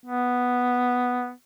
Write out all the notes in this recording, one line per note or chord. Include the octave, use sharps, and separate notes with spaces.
B3